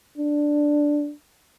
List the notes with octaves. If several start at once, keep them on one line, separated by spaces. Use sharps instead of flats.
D4